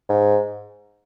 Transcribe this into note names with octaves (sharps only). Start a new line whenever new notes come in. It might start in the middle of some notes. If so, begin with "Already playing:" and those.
G#2